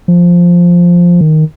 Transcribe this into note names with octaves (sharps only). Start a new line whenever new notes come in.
F3
D#3